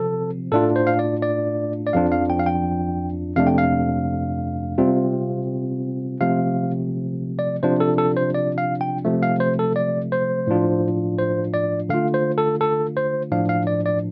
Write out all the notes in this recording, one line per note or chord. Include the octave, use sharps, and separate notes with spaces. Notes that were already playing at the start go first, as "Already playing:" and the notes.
Already playing: C3 F3 C4 A4
A2 A3 D4 F4 A4
C5
F5
D5
D5
D5
F2 F3 D4 F4 F5
F5
G5
F5
G5
F2 C3 A3 D4 F5
G5
F5
C3 G3 C4 F4
C3 F3 A3 F5
D5
C3 F3 D4 F4 C5
A4
A4
C5
D5
F5
G5
C3 F3 A3
F5
C5
A4
D5
C5
A2 F3 D4 F4
C5
D5
D3 A3 F4 F5
C5
A4
A4
C5
A2 F3 D4 F5
F5
D5
D5